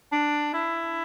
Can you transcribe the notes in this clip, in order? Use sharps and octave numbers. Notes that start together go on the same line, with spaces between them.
D4
E4